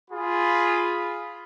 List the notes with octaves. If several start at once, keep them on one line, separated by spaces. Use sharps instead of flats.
F4 G#4 B5